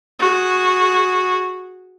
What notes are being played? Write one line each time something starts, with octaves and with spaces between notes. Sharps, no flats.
F#4 G#4